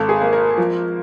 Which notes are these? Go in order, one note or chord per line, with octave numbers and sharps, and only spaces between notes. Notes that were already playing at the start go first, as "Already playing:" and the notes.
Already playing: G#1 A4
G#4
A#3
A#4
F3